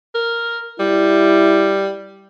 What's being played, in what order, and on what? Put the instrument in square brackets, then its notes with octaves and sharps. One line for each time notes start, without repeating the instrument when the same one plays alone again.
[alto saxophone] A#4
[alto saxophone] G3 [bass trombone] E4